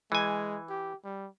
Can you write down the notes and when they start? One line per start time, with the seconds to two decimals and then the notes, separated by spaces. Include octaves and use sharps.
0.12 E3 G#3 G#5
0.69 G4
1.04 G3